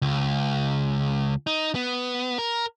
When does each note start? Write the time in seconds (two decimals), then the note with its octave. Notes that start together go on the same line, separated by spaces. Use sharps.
0.02 C#2
1.47 D#4
1.75 B3
2.38 A#4